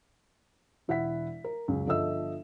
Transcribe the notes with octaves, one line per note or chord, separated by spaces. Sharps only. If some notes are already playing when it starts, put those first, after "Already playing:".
E1 E4 E5 F#5 B6
A#4
C#2 F#2
G1 F3 A4 D#5 E5 E6